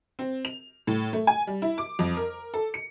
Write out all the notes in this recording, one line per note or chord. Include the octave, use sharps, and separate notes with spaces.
C4
F7
A2
A3
G#5
G3
E4
D6
F2
A#4
A4
C#7